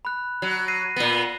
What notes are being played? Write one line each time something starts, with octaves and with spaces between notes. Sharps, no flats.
B5 F#6
F#3
A#6 C7 D#7
A#2 B3